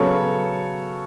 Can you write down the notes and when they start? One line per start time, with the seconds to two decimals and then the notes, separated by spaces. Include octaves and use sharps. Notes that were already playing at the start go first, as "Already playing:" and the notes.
Already playing: C#3 F#3 B3 A4 C#5